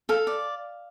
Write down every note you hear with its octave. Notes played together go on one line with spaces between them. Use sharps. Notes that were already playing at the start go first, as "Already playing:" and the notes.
A4 F5
D5